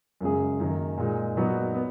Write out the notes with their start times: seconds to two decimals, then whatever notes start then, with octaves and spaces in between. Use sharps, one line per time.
0.21 F#2 C#3 G#3 C#4 G#4
0.60 F#2 D#3 A#3
0.98 A#2 G#3 D#4
1.36 A#2 F#3 B3 D#4 F#4
1.75 B3